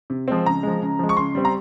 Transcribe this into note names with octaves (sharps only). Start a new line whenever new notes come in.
C3
F3 G#3 C4
C#3 A#5
F3 G#3
C#3
F3 G#3
C#6
C#3 C6
G3 C4
A#5